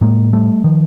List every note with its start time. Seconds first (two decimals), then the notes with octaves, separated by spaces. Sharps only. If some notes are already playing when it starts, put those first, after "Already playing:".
0.01 A2 G#3 A#3
0.33 G3 A3
0.64 D#3 F3